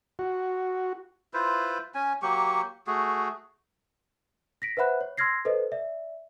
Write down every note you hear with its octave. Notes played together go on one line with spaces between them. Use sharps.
F#4
E4 F4 B4 C5
C#4 G#5
F#3 A#3 G4 C#6
A3 F#4 G#4
A#6 B6 D7
B4 C5 E5 F#5 B5 F#6
C#5
C6 E6 F6 G#6 A#6 C7
A4 B4 C5 D#5
D5 E5